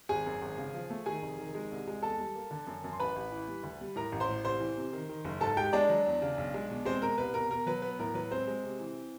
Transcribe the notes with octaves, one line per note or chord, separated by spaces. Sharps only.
G#1 G#4 G#5
F#2
G#1
C#3
F3
A3
D#3 G#4 G#5
F1
D#3
G#3
C2
G#3
E2 A4 A5
G3
A#3
D3
F#2
F#2
C6
A1 B4 B5
A1
E3
G3
D2
G3
A2 A#4 A#5
A1
C5 C6
A2
C2 C5 C6
E3
C3
D#3
D#3
F#1
G#2 A4 A5
G#3 G4 G5
G#3 D4 D5
F#3
E2
C#3
B1
G#3
B2
G#3 C4 C5
B2 A#4
C2 B4
B2 A#4
B2 A#4
F#3 B4
B3 B4
A2 A#4
F#3 B4
G#3 C4 C5
G#3
C3
E3